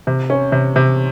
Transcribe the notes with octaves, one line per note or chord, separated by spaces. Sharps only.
C3
C#4
C3
C3